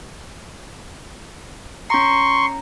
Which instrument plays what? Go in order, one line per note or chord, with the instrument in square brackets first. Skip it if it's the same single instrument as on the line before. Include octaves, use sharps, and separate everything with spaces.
[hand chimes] C#4 A#5 [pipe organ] C6 C#6